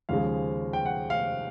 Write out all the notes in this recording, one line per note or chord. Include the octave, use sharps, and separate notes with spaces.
D#2 C#3 F3 G#3 F5
G5
F#5
F5